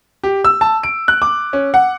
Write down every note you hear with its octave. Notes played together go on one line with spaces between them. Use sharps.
G4
E6
A5
D7
F#6
D6
C#4
F#5